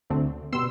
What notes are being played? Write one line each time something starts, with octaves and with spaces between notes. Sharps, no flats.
D2 D3 A3 C4
B2 G3 B3 C6 E6